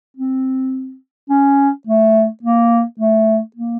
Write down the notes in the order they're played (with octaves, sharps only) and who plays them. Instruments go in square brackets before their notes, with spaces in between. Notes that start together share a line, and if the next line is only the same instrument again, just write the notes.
[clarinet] C4
C#4
A3
A#3
A3
A#3